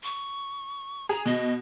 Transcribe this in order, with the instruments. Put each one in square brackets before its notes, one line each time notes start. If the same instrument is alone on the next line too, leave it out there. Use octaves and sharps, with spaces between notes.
[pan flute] C#6
[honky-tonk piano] G#4 [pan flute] A#5
[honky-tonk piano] B2 [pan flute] D#5